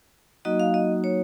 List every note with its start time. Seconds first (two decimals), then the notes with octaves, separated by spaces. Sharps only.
0.45 F#3 A#3 D#4 F#4 D#5
0.60 F5
0.74 D#5
1.04 C#5